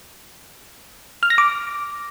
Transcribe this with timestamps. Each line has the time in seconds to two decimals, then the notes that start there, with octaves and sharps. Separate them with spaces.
1.23 F6
1.30 A#6
1.38 D6